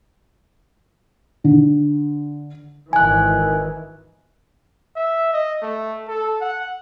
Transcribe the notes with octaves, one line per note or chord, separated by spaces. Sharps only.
D3
G#1 D#3 E3 G#5 F#6
E5
D#5
A3
A4
F#5